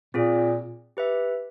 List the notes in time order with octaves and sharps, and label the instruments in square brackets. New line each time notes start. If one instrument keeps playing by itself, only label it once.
[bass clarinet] A#2 [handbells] C4 F4 G#4
[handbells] G4 B4 E5